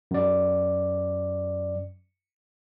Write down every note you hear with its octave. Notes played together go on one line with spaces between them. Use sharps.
F#2 D5